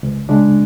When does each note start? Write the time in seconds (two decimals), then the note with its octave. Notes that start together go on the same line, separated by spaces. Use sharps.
0.03 C#2
0.29 C#3 G#3 D4